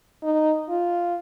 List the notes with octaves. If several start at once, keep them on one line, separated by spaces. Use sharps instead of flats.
D#4
F4